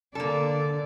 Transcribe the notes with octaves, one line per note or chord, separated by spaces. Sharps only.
D3 A#3 D4 A4 D5